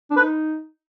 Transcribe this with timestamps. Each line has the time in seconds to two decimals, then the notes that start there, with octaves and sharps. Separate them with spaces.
0.11 D4
0.16 B4
0.22 D#4